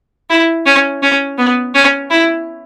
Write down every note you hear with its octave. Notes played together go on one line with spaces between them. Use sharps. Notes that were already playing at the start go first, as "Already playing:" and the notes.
E4
C#4
C#4
B3
C#4
E4